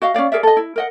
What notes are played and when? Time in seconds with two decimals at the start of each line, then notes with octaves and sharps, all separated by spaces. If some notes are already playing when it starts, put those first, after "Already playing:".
0.02 F#4 D#5 F5
0.14 C#4 F#4 D5 F5
0.32 G#4 A#4 D5 E5
0.43 A4 D#5
0.57 E4
0.76 A#4 D#5 F#5